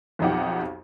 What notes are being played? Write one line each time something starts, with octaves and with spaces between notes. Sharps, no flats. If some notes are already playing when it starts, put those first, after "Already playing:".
B1 F2 F3 D#4 G4 F#5